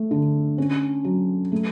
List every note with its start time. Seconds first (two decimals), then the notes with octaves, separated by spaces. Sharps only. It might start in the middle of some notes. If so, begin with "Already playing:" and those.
Already playing: A3
0.11 D3
0.58 C#4
1.04 F#3
1.52 A3